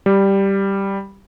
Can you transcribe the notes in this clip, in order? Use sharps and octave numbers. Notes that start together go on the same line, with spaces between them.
G3